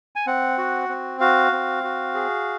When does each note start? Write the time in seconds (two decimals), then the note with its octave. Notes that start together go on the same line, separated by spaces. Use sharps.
0.16 G#5
0.27 C4 F#5
0.58 F#4
0.89 C4
1.20 F#4 F5
1.52 C4
1.84 F#4
2.14 G#4